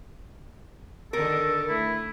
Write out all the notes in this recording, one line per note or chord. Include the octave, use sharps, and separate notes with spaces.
D3 D#3 A4 A#4
A3 E4